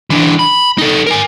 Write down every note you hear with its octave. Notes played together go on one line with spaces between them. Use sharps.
E3 D4
B5
D#4 A4
A#4 G#5